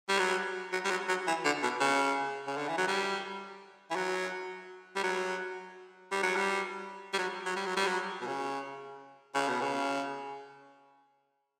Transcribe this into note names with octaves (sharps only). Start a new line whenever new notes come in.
G3
F#3
F#3
G3
F#3
F#3
E3
D3
B2
C#3
C#3
D3
E3
F#3
G3
E3
F#3
G3
F#3
G3
F#3
G3
G3
F#3
F#3
G3
F#3
G3
F#3
B2
C#3
C#3
B2
C#3